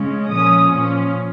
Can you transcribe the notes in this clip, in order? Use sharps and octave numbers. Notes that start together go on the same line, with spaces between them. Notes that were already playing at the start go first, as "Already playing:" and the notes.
Already playing: C#3 G#3 C#4
A#2 F3 C#4 D#6
A#2 F3 C#4